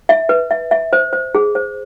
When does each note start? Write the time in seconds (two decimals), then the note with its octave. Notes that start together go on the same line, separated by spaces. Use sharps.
0.09 E5
0.29 B4
0.51 E5
0.71 E5
0.93 C5
1.13 C5
1.35 G#4
1.55 C5